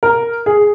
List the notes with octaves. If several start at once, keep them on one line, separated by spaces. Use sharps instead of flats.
A#4
G#4